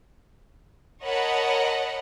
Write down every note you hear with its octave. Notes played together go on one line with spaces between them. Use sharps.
A#4 C#5 D#5 F#5 A5 B5